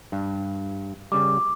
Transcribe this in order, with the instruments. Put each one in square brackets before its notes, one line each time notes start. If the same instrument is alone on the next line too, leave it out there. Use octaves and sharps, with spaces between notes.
[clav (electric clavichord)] G2
[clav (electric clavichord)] C#3 G3 [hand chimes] D6